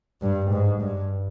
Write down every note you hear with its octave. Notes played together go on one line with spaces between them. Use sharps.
G2
G#2
G2